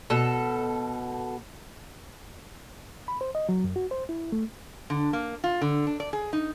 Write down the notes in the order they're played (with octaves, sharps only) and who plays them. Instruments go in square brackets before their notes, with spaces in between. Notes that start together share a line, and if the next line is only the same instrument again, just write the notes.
[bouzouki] B2 A4
[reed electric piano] B5
C5
D#5
F#3
F#2
F#4
C5
E4
A3
[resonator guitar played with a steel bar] D3
A#3
F4
D3
D4
D5
G#4
D#4